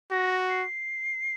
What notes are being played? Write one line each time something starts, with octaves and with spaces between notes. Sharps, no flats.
F#4 A#6
C7